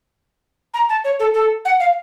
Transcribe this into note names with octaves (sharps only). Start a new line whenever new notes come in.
A#5
A5
C#5
A4
A4
F#5
F5